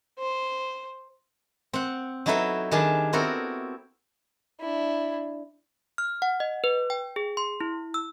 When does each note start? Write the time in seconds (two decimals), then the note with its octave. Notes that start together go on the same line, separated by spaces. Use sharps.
0.19 C5
1.73 C4 F#5
2.26 F#3 D#4 E4 A4 B4 E5
2.71 D#3 G3 D4 G#4 A5
3.13 B3 C4 E4 F#4 A4 A#4
4.60 D4 E4
5.98 F6
6.22 F#5
6.40 D#5
6.64 B4
6.90 G5
7.16 G#4
7.37 C6
7.61 E4
7.94 E6